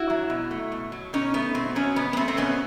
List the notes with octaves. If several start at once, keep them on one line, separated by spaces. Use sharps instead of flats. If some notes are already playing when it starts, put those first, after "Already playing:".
Already playing: E4 F#4
F#3
B2
A3
B2
F#3
B2 C#4 D#4
A3 B3
B2 C4
F#3 B3 C#4
B2 B3
B3
A3 C4
C4
B2 B3 C#4